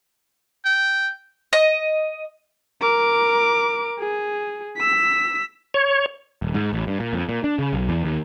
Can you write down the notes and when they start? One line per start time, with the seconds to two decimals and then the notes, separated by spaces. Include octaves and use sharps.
0.65 G5
1.53 D#5
2.82 A#4 D6
3.99 G#4
4.77 E6 B6
5.74 C#5
6.42 D#1
6.55 G#2
6.73 A1
6.87 G2
7.00 A#2
7.13 F2
7.29 A#2
7.44 D4
7.59 C#3
7.73 B1
7.89 E2
8.05 D#2